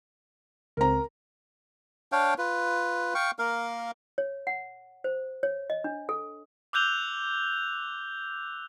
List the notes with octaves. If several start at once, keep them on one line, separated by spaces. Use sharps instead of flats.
C#2 C4 A#4 A#5
D4 C#5 F5 G5
F4 B4
F5 G5 C#6
A#3 A#4 F5
C#5
F#5
C5
C#5
D#5
D4
A4
D6 E6 F#6 G6 F7 G7